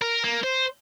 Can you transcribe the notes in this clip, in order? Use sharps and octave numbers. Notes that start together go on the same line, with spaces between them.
A#4
A#3
C5